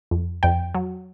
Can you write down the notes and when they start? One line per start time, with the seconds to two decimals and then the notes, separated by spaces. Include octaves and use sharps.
0.11 F2
0.43 F2 G5
0.75 F#3